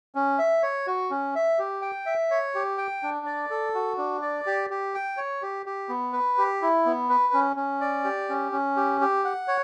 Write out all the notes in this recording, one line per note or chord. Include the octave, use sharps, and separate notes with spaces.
C#4
E5
C#5
F#4
C#4
E5
G4
G5
E5
C#5
G4
G5
D4
D5
A4
F#4
D4
D5
G4
G4
G5
C#5
G4
G4
B3
B4
G4
E4
B3
B4
C#4
C#4
D5
G4
C#4
C#4
G4
G4
F#5
C#5